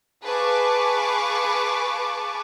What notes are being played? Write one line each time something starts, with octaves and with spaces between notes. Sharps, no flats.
G#4 B4 F5 A5 C#6 D6